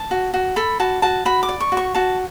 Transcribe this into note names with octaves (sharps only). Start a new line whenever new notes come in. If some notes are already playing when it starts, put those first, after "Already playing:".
Already playing: A5
F#4
F#4
A4 B5
F#4 A5
F#4 A5
F#4 B5
D6
D5
C#6
F#4
C#6
F#4 A5